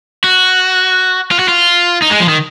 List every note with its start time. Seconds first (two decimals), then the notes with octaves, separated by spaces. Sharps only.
0.24 F#4
1.31 F4
1.39 F#4
1.48 F4
2.02 D#4
2.11 G#3
2.20 F3
2.29 D#3